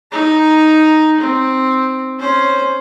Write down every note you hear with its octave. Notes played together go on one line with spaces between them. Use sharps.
D#4 A#5
C4
C#4 C5